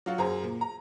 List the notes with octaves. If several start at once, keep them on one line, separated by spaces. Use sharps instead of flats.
F#3 F4 F#4
F#2 G#4 C5 A#5
A#2
A#5